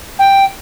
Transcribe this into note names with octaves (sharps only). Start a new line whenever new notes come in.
G5